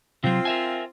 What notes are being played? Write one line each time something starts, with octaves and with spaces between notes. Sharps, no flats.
C3 F#3 C4 F4
A#4 E5 G#5